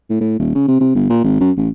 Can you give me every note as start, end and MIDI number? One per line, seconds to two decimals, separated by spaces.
0.10 0.20 45
0.21 0.35 45
0.39 0.52 27
0.55 0.66 49
0.68 0.76 48
0.80 0.91 48
0.95 1.05 31
1.10 1.21 46
1.24 1.40 32
1.40 1.51 42
1.57 1.69 33